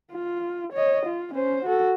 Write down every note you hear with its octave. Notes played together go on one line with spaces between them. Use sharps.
F4
C#5 D#5
F4
C#4 C5
F#4 A4